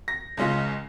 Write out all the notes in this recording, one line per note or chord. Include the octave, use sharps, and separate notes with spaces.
A#6
C#2 G#3 C#4 F4 A#6